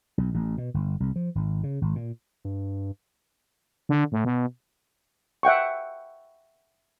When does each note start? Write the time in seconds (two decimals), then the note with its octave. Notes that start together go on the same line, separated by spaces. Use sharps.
0.18 B1
0.34 A1
0.58 B2
0.74 G1
1.00 C2
1.16 F3
1.35 G#1
1.64 C#3
1.81 G#1
1.95 A#2
2.45 G2
3.89 D3
4.12 A2
4.25 B2
5.43 E5 F#5 G5 C#6